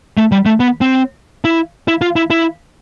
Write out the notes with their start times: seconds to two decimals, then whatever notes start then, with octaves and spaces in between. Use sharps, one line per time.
0.17 A3
0.32 G3
0.46 A3
0.60 B3
0.81 C4
1.45 E4
1.88 E4
2.01 F4
2.16 E4
2.30 E4